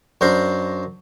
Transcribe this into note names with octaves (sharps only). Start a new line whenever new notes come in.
F#2 D4 A#4 C5 D5 C6